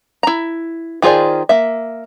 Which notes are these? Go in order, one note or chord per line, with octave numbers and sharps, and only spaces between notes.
E4 A#5
D#3 F4 G#4 C5 D5
A#3 E5